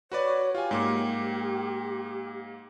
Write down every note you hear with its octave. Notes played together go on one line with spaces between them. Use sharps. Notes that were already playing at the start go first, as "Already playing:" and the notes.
F#4 B4 C#5 D5
F4 G4 G#5
G#2 A#3 D6